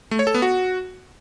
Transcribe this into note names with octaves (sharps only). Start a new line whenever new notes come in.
A3
C#5
A4
B3
F#4